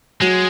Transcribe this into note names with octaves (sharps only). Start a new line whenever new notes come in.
F#3 G#3